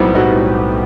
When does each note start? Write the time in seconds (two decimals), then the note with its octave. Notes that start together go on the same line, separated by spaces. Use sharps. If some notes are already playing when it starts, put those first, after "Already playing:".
Already playing: B1 A2 G3 B3 C4 D#4 E4 F#4
0.15 A2 D#4 F#4